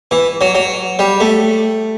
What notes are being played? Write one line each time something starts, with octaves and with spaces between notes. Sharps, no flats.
E3
F#3
F#3
G3
A3